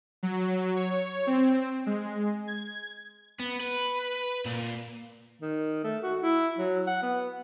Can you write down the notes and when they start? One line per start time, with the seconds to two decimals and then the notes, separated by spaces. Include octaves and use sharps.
0.23 F#3
0.76 C#5
1.27 C4
1.86 G#3
2.48 G#6
3.40 B3
3.60 B4
4.46 A#2
5.42 D#3
5.84 A3
6.03 F#4
6.23 E4
6.58 F#3
6.87 F#5
7.03 B3